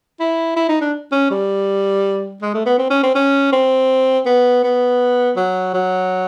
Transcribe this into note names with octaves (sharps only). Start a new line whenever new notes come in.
E4
E4
D#4
D4
C#4
G3
G#3
A3
B3
C4
C#4
C4
C#4
C4
B3
B3
F#3
F#3